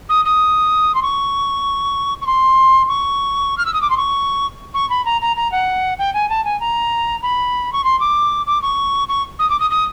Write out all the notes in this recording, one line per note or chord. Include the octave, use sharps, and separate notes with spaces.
D#6
D#6
C6
C#6
C#6
C6
C#6
F6
E6
D#6
D6
C6
C#6
C#6
B5
A#5
A#5
A#5
F#5
G5
G#5
A5
G#5
A#5
B5
C#6
C6
D6
D6
C#6
C#6
D#6
D6
D#6
D#6